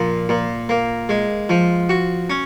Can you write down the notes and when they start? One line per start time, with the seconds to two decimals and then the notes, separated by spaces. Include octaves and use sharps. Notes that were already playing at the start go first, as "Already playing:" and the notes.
Already playing: A#2 F3
0.29 A#2
0.69 A#3
1.09 G#3
1.49 F3
1.89 F#4
2.30 C#4